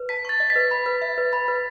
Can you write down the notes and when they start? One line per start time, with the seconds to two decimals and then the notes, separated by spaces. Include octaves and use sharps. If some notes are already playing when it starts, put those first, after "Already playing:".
Already playing: B4
0.09 A5 B6
0.25 C#6 A6
0.40 D#5
0.50 B6
0.56 B4
0.71 B5
0.86 B4
1.02 E5
1.18 B4
1.33 B5
1.48 B4